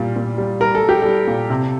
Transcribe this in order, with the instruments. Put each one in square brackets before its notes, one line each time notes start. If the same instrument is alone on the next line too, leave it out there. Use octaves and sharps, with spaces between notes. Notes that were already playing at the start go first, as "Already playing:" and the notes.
Already playing: [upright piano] A#2 G3
A#2
G3
G3 A#4
A4
G3
G4
G3 A4
A#2
C3